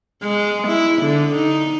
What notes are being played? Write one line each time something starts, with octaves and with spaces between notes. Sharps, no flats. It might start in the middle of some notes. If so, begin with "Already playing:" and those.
G#3
E4
D3
D#4